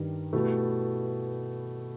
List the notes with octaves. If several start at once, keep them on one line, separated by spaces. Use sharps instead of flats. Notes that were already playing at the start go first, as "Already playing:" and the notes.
Already playing: G2 D#3 G3
B2 A3 E4 G4